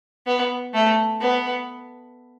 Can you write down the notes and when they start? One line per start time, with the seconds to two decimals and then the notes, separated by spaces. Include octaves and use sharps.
0.27 B3
0.74 A3
1.21 B3